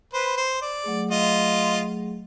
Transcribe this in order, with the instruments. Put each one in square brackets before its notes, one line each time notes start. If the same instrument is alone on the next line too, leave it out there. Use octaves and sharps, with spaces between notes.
[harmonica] B4 C5
C5
D5
[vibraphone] F#3 A3 G#4
[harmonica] F4 D#5